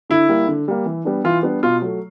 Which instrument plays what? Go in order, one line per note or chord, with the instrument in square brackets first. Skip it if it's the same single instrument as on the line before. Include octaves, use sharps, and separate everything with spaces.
[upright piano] D3 [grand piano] E4
[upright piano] G3 A#3
D3
G3 A#3
E3
G3 B3 D4
[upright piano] E3 [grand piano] F4
[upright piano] G3 B3 D4
[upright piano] B2 [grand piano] F4
[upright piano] F#3 A3